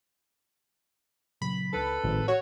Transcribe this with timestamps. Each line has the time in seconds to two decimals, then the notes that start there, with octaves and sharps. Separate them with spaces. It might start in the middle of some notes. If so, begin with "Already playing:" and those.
1.42 A#2 C#3 F#3 B5
1.73 C#2 D4 A4 B4
2.04 G#1 A2 F3
2.28 F#4 C#5